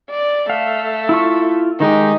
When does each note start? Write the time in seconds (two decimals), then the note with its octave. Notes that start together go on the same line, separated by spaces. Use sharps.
0.10 D5
0.50 A3 F5
1.09 E4 F4 C#6
1.80 D#3 G#3 D#4 G4